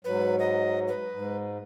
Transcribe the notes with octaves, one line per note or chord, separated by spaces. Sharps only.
G#2 F#3 B4
D#5
B4
G#2